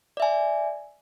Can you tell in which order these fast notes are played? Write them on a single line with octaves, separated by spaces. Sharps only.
D5 E5 G#5